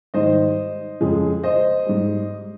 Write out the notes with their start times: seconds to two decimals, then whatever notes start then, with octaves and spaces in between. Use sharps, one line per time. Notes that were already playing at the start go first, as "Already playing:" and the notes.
0.14 G#2 D#3 G3 C5 D#5
1.01 F2 C#3 F3 G#3
1.44 C5 D#5
1.86 G#2 G3